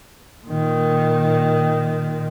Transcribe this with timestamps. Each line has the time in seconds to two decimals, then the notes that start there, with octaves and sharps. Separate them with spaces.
0.47 A#2 D#3